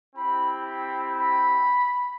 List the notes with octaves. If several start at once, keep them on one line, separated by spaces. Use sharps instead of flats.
C4 E4 G4 B5
B5
B5